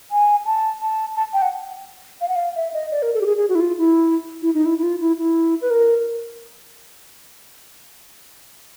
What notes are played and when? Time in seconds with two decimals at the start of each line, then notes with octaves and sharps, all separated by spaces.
0.11 G#5
0.46 A5
0.81 A5
1.16 A5
1.33 G5
1.42 F#5
2.21 F5
2.28 F#5
2.35 F5
2.56 E5
2.73 D#5
2.91 D5
3.02 A#4
3.14 A4
3.21 G4
3.26 G#4
3.37 G#4
3.49 F#4
3.55 E4
3.60 F4
3.78 E4
4.42 E4
4.54 D#4
4.65 E4
4.78 E4
4.83 F4
5.00 E4
5.18 E4
5.61 B4
5.70 A#4